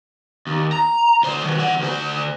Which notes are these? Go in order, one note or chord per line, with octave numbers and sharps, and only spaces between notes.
D#2
A#5
D2 C5
D#3 F#3
E3 F#5
D2 C5